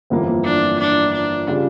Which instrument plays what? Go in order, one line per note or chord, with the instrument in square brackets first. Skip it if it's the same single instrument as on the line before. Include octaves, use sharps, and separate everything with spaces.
[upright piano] G1 F2 E3 A#3
[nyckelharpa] D4
D4
D4
[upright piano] C#3 G3 C#4 F4